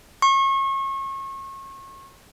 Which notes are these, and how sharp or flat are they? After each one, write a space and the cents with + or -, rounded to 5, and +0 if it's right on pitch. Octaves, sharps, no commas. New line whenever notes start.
C#6 -35